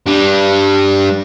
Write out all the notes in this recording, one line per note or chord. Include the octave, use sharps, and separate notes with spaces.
G3 D4